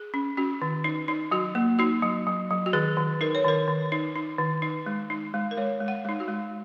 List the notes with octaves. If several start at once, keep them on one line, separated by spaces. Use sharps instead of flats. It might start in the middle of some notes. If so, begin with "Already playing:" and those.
Already playing: G#4
C#4
C#4 F#4
D#3
D#4
D#4
F#3 F#4
A#3
D#4 F#4
F#3
F#3
F#3
F#4
D#3 G#4
D#3
D#4 A#4
C#5
D#3 A#4
D#3
D#4
D#4
D#3
D#4
G#3
D#4
G#3
A#4
G#3 C#5
G#3
F#5
G#3 D#4
F#4
G#3